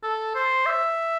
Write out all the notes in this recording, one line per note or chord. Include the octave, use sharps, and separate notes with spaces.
A4
C5
E5